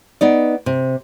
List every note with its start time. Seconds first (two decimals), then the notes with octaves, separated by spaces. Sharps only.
0.21 B3 D#4 D5
0.66 C3